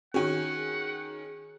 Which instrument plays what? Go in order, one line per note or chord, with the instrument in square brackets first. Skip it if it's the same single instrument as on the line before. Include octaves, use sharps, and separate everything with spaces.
[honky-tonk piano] D#3 C#4 [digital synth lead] F#4 [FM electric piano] G#4 [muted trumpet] F#5